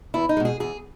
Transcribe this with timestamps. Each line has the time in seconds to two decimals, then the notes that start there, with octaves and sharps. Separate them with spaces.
0.14 E2 E4
0.29 D#4
0.37 B2 G#3
0.45 G#4
0.60 E2 G#4